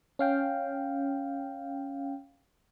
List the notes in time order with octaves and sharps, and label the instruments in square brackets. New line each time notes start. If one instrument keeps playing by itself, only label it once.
[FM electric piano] C#4 F5 G5